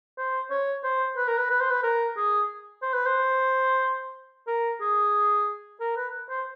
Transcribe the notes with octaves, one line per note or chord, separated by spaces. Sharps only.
C5
C#5
C5
B4
A#4
B4
B4
C5
B4
A#4
G#4
C5
B4
C5
A#4
G#4
A#4
B4
C5